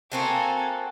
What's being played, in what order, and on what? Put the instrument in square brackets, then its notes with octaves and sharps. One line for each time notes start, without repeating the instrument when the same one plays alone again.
[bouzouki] A#3 C4 F#4 [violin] A4 G#5